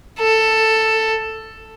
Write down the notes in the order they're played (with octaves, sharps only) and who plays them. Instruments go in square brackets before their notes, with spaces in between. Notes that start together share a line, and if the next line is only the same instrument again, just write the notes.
[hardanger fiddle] A4